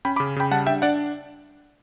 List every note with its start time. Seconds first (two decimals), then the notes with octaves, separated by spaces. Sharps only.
0.05 C#4 G5 B5
0.16 B5 D6
0.20 C#3
0.36 C#3 G5 B5
0.51 G3 F#5 A5
0.67 D4 E5 G5
0.82 D4 D5 F#5